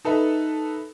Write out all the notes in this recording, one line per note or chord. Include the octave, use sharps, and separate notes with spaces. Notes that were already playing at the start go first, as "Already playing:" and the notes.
D#4 A4 B4 E5